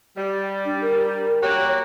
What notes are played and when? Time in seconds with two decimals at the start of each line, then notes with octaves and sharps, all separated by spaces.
0.16 G3
0.65 D4
0.81 A#4
1.42 A#3 F#4 G4 C#5